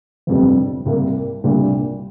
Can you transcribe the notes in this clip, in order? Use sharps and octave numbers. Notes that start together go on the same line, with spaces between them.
G1 F2 C3 G3
C2 C3 G3 A#3
C2 A#2 G3 D4